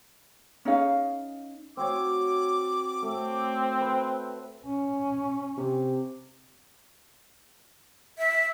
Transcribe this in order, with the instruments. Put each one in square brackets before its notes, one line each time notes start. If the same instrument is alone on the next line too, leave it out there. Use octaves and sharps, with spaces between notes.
[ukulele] C#4 D#4 G#4 F5
[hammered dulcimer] C4 F#4 C#5 [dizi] D6
[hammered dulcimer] A3 [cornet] C4
[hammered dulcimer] B4
[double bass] C#4
[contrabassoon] C3
[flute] E5